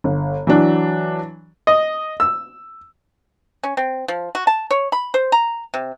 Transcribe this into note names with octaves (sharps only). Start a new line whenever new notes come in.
G1
E3 F#3 D4
D#5
E6
C#4
C4
F3
F#4
A5
C#5
B5
C5
A#5
C3